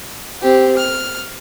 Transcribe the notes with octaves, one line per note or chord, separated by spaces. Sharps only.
C4 G4
F6